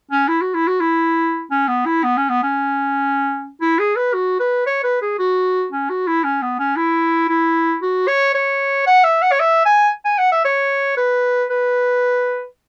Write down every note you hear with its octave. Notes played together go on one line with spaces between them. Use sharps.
C#4
E4
F#4
E4
F#4
E4
C#4
B3
E4
B3
C#4
B3
C#4
E4
G#4
B4
F#4
B4
C#5
B4
G#4
F#4
C#4
F#4
E4
C#4
B3
C#4
E4
E4
F#4
C#5
C#5
F#5
E5
F#5
C#5
E5
G#5
G#5
F#5
E5
C#5
B4
B4